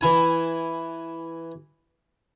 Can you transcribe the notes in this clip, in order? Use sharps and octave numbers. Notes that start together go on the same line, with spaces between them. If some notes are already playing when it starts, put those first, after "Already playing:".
E3 E4 G#5